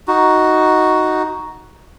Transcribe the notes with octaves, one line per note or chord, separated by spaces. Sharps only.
D#4 F#4